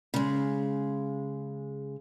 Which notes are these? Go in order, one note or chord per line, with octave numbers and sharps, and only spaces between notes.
C#3 G#3